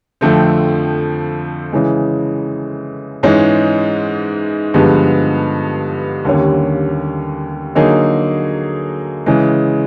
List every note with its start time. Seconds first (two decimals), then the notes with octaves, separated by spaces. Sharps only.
0.21 F2 D3 F3 A3 C4
1.72 C#3 E3 G#3
3.23 G#2 E3 G#3 C#4
4.74 G2 D3 F3 G#3 B3
6.25 D#2 D3 G3 A#3 C#4
7.75 D3 F#3 A#3 D#4 G#4
9.26 C#3 E3 G#3